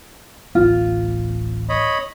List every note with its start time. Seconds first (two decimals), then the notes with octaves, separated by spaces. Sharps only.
0.55 D1 A1 B3 F4
1.69 C#5 D#5 B5